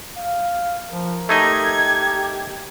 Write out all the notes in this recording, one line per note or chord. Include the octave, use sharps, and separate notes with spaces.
F5
F3 A#4
A3 D#4 G4 D#5 G#6